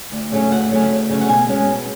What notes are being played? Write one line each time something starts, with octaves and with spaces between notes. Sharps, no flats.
D2
C#3 F#3 A3 C#4
D2 F#5
C#3 F#3 A3 C#4
D2
C#3 F#3 A3 C#4
F#5
B2 G#5
G#3 C#4
B2